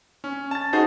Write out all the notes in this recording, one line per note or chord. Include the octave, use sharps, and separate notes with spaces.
C#4
A5 A6
D#4 F#4 G#4 C5